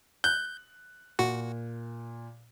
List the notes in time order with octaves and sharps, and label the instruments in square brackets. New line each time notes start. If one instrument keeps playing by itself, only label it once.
[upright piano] F#6 [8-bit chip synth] G6
[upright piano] A#2 [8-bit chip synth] F#4